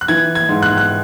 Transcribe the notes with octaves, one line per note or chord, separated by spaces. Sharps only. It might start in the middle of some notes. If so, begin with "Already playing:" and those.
F#6
E3 G#6
G#6
G#2
F#6
F#6